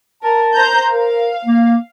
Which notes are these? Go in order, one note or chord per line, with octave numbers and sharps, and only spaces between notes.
A#4 A5
C5 A#5 G6
A#4 F5
A#3